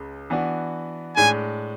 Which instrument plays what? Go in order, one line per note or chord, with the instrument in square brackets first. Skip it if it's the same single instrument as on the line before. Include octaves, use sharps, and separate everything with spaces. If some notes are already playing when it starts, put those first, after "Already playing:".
Already playing: [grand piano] C#2 C#3 G#3
E3 B3 D4 F#4
[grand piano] A2 G#3 D4 [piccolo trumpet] G#5